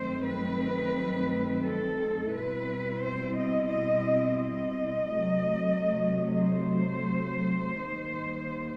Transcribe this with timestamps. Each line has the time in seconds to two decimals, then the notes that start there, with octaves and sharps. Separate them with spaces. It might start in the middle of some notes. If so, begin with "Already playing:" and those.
Already playing: G2 D#3 F#3 A3 C4 C5
0.26 B4
1.64 A4
2.32 B2 G3 C4 E4 B4
3.01 C5
3.35 D#5
3.69 D#5
4.38 D#5
5.07 C3 F#3 A3
6.44 C5
7.81 D#2 D#3 G3